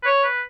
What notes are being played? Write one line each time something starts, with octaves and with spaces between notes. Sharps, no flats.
B4
C#5
B4